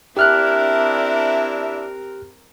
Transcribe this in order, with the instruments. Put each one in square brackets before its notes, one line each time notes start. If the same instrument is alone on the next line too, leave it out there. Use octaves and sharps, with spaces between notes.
[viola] C4 A#4 [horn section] D4 E4 [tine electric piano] G4 F6 F#6 [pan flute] E5